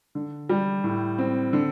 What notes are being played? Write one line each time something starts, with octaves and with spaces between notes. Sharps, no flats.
D3
G3
A2
C4
D3